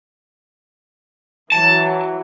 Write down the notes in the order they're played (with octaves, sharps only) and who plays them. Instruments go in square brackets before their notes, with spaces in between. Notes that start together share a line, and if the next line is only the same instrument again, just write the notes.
[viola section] E3 F#3 [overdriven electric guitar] A5